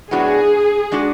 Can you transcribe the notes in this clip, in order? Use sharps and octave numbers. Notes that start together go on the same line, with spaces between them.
A2 F#3 B3 D4 F#4 G#4
G#3 D4 F#4